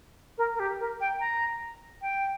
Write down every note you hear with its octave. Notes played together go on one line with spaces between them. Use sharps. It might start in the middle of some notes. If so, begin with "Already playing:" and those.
A#4
A#4
G4
A#4
G5
A#5
G5